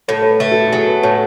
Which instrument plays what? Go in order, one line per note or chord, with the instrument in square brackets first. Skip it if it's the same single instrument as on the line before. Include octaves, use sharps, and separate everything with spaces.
[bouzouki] A2 [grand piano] C#5
[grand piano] C#5
B4
[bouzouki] A3
[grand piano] A4
F#4
[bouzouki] F#3 [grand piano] G#4
[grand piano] B4
[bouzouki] A2 [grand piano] C#5